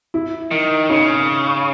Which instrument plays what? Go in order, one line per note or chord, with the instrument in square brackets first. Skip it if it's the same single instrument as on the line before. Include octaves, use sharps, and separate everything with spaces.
[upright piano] E4
[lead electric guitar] D#3
[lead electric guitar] C#3 [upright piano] D#4